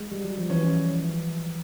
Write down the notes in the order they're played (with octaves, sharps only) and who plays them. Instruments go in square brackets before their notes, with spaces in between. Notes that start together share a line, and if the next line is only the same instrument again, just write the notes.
[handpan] G#3
G3
F#3
F3
[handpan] E3 [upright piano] C#4